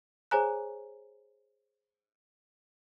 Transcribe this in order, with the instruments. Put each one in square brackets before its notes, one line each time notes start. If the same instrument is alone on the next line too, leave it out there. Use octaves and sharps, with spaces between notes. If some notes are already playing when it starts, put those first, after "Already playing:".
[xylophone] G#4 C5 C#5 G#5 A#5 F#6